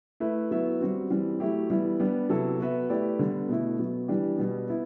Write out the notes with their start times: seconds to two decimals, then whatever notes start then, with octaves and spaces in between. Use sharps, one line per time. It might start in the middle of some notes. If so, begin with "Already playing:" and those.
0.20 A3 E4 B4 E5
0.51 F#3 B3 E4 B4 E5
0.81 G3 C4 F#4
1.10 E3 G3 C4
1.40 F#3 A3 E4 G4
1.70 E3 G3 B3 E4
2.00 G3 B3 D4 G4
2.29 C3 F#3 B3 E4 A4
2.60 B3 F#4 B4 E5
2.89 A3 E4 G4 B4 D5
3.19 D3 G3 B3
3.49 B2 A3 E4
3.79 B2 F#3 B3
4.08 E3 G3 D4 G4
4.38 B2 G3 B3
4.68 B3 E4